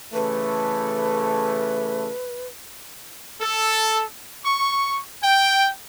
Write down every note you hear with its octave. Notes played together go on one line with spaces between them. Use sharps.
C#3 E3 A3 B4
A4
C#6
G5